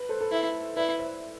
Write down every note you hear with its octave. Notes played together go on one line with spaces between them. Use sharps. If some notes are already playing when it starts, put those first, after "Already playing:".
Already playing: B4
A4 C5
A4
E4 B4
E4 B4 D5
C5 E5